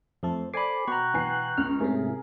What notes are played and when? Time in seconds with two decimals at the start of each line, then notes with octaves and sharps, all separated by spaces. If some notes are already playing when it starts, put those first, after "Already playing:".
0.23 F2 A3 A4 C5
0.54 A4 C5 D5 G#5 B5 D6 C7
0.88 B2 F#5 G5 A#5 C#6 F#6
1.14 E3 G#5 C7
1.58 C#2 F6
1.80 G#2 C3 A3 C#4 E4 G#4 A#4